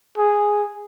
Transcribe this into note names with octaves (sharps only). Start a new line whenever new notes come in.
G#4